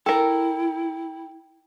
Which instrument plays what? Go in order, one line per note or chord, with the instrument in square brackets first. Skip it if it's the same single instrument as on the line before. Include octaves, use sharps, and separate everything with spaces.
[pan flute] E4 [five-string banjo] A4 A#4 [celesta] G5